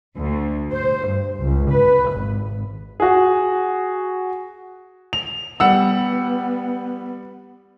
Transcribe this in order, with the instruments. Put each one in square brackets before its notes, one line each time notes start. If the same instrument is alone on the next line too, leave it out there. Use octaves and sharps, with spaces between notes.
[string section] D2
C5
G2
C#2
B4
G#1
[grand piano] F#4 G#4
F7
[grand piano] G3 F#5 E6 [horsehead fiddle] B3